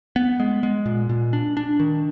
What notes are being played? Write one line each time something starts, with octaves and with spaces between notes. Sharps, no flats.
B3
G#3
G#3
A#2
A#2
D4
D4
D#3